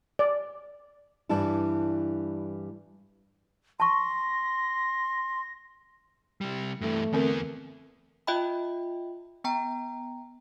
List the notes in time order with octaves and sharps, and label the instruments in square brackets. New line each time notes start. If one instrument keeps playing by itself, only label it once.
[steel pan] D5
[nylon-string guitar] G2 E3 G3 D4 E4 A5
[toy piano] A5 C#6 [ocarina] C6 [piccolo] A#6
[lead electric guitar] C3 G3
[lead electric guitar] G2 E3 [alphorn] A3
[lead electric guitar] E2 B3 [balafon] D3 C4 A#4
[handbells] F4 D#5 E5 G5 B5
B3 G5 A#5